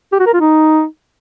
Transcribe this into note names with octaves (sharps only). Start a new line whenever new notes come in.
G4
F#4
A#4
F4
D#4